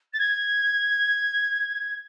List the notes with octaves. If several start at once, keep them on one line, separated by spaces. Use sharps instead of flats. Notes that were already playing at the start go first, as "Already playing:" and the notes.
A6
G#6